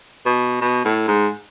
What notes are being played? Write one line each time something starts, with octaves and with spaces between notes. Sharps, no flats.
B2
B2
A2
G#2